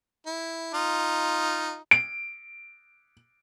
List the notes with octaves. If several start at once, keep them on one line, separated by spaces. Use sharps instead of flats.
E4
D#4 F4
D7